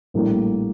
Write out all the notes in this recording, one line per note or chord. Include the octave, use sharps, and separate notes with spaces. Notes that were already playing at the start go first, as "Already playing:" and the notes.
A#1 A2 G3 A#3